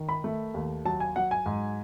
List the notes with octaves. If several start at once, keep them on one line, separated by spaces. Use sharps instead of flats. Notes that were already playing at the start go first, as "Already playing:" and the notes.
Already playing: D#3
B5
A3
D#2
F#3 A5
G#5
F#3 F#5
G#5
G#2